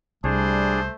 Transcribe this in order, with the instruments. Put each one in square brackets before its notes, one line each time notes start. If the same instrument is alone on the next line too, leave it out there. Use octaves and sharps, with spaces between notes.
[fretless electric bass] C2 [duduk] G3 [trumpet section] A3 C5 [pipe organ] D4 G#4